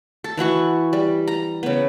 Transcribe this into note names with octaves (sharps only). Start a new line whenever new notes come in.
A4
E3 E4 F#4 C#6
G3
A#5
C#3 B3